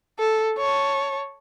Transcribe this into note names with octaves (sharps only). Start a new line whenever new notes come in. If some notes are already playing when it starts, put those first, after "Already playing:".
A4
C#5 A5